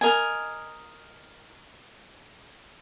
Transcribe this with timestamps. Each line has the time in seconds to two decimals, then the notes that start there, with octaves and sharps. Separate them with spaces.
0.01 A#4 D#5 G#5